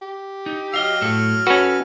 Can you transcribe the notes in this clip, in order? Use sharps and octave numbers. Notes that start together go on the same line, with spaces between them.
G4
D#4
F#3 D#5 F5 F6
A2 A4
C#4 F#4 A4 B4